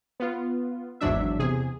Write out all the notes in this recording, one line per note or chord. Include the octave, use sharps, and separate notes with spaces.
B3 F4
G#1 E2 G#2 F#3 D4 E5
E2 C3 G#4